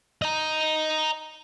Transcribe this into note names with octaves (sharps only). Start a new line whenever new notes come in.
D#5 A#5